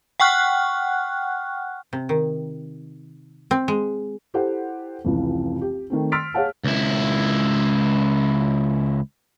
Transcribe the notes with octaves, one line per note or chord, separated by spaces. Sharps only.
F#5 G5 C#6 F6 F#6
C3
D#3
C4
G#3
E4 G4 A4 C5 F#5
F1 C#2 E3
G4
D#3 A3 C4
C6 E6 F6 A6 B6 D7
G#4 C#5 F5 F#5 A5
C#2 E4